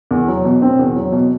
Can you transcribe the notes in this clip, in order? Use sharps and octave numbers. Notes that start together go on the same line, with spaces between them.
E2
F#3
B2
C4
E2
F#3
B2